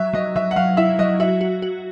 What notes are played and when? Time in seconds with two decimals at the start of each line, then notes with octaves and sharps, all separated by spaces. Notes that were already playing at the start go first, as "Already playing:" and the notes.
Already playing: F#3 E5
0.13 F#3 D#5
0.36 F#3 E5
0.51 F#5
0.56 F#3 F5
0.77 E4 E5
0.99 F#3 D#5
1.20 F#4 E5
1.41 F#4
1.62 F#4